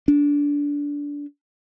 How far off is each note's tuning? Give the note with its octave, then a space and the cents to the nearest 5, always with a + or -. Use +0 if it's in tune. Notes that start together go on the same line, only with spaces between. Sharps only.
D4 -20